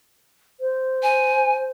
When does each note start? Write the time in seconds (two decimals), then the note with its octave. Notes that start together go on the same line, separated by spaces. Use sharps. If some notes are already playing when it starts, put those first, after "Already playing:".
0.60 C5
1.03 G#5